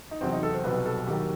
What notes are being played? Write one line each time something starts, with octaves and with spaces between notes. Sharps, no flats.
D#4
E2 C3 F#3 C4
D#4
A4
C5
C2 B2 F#3 B4
A4
D#2 D#3 F#3 G4